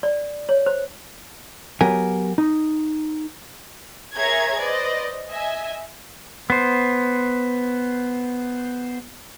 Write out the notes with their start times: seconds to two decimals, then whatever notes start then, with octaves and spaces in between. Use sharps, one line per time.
0.03 D5
0.49 C#5
0.66 C5
1.81 F#3 B3 G4 A#4 G#5
2.38 D#4
4.15 G#4 A#4 C#5 E5 A#5 G#6
4.59 B4 C5 D5 D#5
5.29 D#5 E5 G#5
6.50 B3 C5